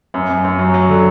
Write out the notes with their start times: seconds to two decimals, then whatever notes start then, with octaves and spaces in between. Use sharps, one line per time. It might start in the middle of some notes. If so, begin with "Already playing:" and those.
0.14 F#2
0.29 F#2
0.44 F#2
0.59 F#3
0.74 F#3
0.89 D3